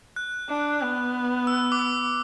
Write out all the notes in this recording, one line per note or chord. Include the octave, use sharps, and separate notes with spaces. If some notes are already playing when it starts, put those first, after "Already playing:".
F#6
D4
B3
E6
D6
E6